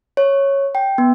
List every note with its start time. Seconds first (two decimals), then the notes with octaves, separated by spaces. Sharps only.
0.17 C#5
0.75 G5
0.98 B3